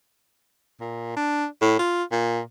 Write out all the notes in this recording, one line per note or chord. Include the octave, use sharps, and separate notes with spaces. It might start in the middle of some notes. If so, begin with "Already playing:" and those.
A#2
D4
A2
F4
A#2